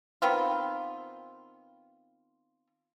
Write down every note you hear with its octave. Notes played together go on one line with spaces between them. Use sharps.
D#3 B3 C4 F4